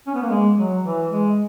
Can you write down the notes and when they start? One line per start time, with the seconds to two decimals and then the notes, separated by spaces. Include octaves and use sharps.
0.07 C#4
0.15 B3
0.22 A#3
0.29 G#3
0.57 F#3
0.83 E3
1.10 G#3